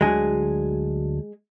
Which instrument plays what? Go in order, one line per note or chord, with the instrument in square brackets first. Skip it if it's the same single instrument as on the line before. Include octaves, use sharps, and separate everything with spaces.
[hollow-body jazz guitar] D2 D3 F#3 G#3 G#4